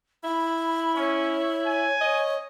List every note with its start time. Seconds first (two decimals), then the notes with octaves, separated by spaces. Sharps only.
0.24 E4 B5
0.96 C#4 C#5
1.66 G#5
2.01 C#5 D#5